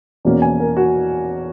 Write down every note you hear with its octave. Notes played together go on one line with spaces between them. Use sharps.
E2 B2 A#3 C#4
G#5
A#4
F#4